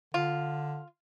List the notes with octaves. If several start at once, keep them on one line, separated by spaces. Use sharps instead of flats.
D3 F4